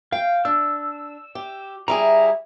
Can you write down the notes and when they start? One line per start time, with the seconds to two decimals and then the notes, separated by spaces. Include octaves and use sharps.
0.12 F5 G5
0.45 D4 E6
1.35 G4
1.88 G3 E4 G#4 A#5